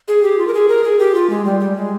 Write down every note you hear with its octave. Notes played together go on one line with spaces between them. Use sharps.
G#4
G4
F4
A#4
G#4
A#4
G#4
G4
F4
G#3
G3
G3
G#3